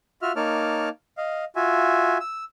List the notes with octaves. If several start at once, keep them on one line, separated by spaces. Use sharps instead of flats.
F4 F#4 E5 F6
A#3 D#4 C#5 A5 D6 F6
D#5 F5
F4 F#4 E5 G#5
E6